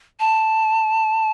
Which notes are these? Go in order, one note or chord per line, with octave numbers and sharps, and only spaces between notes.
A5